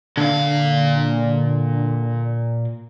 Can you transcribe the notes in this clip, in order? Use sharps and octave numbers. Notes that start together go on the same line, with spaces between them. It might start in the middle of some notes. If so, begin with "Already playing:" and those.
A#2 D3 F5